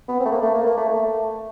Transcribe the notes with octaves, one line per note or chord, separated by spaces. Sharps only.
B3
C4
A3
A#3
A3
A#3
A#3
A3
A3